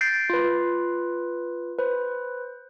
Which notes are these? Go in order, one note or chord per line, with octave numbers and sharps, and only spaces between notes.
G6 A6 A#6 C7 D7
F4 B4
B4 C5